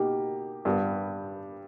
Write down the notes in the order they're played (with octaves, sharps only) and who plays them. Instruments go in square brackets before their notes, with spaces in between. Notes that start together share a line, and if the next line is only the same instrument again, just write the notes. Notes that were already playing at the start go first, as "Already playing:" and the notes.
Already playing: [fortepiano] B2 A#3 D#4 [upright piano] G4
[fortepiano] G2 G3 B3